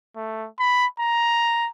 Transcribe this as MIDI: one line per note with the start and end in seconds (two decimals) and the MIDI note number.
0.16 0.47 57
0.59 0.86 83
0.99 1.69 82